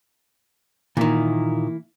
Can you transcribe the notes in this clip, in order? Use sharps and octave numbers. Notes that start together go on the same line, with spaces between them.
A#2 D#3 E3 A#3 E4